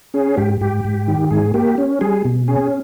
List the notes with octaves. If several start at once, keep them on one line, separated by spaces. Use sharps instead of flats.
C#4 G#4
G#2 G4
G#2 G4
G#2
D#3
G#2 G#4
A#3 G4
C#4
G3 G#4
B2
C#4 G#4